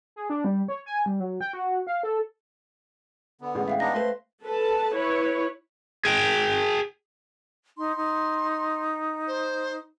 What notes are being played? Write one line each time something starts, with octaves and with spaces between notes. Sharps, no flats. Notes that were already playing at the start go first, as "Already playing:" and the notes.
G#4
D4
G3
C#5
G#5
G3
F#3
G5
F#4
F5
A4
D3 B3
A1 G#3
E5 F5 G5
B3 D4 D#4 A#6
A3 B4 C5 C6
A4 B4 A5
E4 B4 C#5
G#4 G5
D#4 C6
D#4
C5